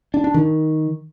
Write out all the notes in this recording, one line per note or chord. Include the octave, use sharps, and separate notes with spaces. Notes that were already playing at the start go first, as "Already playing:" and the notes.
D4
D4
D#3